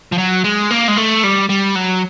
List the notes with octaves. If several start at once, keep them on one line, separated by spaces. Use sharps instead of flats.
F3
F#3
G#3
A#3
G#3
A3
G3
G3
F#3